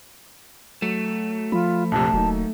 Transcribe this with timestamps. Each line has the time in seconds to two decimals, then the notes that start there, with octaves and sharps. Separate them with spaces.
0.82 F#3 A3
1.52 F3 F4 B5
1.92 A#1 F2 C3 A5
2.13 D#1 F#3 A#3 D#4